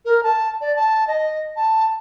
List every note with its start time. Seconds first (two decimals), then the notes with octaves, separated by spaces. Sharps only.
0.05 A#4
0.23 A5
0.61 D5
0.76 A5
1.07 D#5
1.56 A5